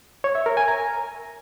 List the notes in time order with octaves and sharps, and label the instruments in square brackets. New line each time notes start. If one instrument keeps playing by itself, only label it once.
[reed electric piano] C#5
E5
A#4
G#5
A#5